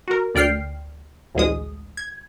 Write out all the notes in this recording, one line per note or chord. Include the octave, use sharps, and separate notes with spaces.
F#4 A#4
D2 D5 G5 F6 C7
A1 D2 G#3 D#6
G#6